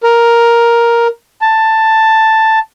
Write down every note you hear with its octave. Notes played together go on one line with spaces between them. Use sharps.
A#4
A5